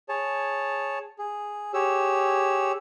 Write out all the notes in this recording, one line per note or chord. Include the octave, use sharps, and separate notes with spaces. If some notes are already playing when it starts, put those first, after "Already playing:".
G#4 C#5 A5
G#4
G4 G#4 C#5 E6